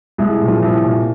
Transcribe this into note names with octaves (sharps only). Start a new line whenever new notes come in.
C2 G#3 G#4
A#2
F3 F4
C2
A#2